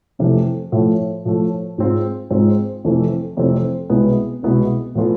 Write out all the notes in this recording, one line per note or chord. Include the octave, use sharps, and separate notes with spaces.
F2 C3 E3 A3
A2 F3 A3
A2 F3 A3
G#2 G#3 C4 F4
G#2 G#3 C4 F4
F2 C3 E3 A3 C4
F2 C3 E3 A3 C4
C2 B2 G#3 B3 E4
C2 B2 G#3 B3 E4
A2 E3 B3 F4 A4